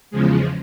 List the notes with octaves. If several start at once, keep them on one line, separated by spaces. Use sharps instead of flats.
E2 C#3 F3 G#3